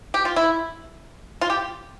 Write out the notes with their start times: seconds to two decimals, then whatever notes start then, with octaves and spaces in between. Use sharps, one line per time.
0.14 G4
0.25 F4
0.36 E4
1.41 F4
1.50 G4